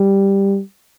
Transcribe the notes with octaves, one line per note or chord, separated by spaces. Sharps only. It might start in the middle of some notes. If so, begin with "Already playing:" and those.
Already playing: G3